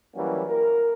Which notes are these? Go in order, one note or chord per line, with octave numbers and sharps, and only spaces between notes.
E3 F#3 G3 A#3 C#4 F#4
A#4